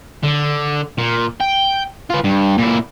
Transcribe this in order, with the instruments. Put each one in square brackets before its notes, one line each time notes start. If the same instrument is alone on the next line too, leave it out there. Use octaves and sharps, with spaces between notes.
[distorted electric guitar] D3
A#2
G5
F4 B4
G2
A#2 E4